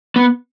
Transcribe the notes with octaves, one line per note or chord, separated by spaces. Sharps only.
B3